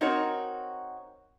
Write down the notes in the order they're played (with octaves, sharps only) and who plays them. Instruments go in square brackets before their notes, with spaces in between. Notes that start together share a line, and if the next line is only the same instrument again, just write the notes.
[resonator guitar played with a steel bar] C4 D#4 F#4 A#4 C#5